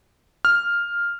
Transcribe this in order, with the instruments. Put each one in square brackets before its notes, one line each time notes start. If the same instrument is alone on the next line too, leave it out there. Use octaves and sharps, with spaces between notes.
[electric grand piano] F6